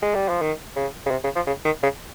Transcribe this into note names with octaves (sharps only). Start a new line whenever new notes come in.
G#3
G3
F3
D#3
C#3
C#3
C3
C#3
F3
C#3
D#3
C#3